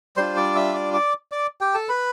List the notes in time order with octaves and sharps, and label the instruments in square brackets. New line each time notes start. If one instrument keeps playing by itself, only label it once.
[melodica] G3 D4 F4 C5 C6
D5 D6
E5 E6
D5 D6
D5 D6
D5 D6
G4 G5
A4 A5
B4 B5